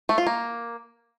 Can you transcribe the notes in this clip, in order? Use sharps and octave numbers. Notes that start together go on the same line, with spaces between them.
A3
F4
A#3